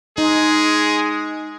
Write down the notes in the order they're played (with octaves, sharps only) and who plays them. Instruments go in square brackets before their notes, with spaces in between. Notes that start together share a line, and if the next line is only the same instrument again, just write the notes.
[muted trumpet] G#3 [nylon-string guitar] D#4 [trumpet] G#4